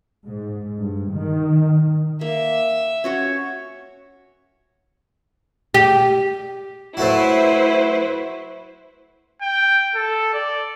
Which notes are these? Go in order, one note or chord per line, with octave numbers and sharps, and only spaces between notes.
G#2
G2
D#3
A#3 E5
C#4 F#4 C#5
G4
F#3 A3 E4 B4 C5
G5
A4
D5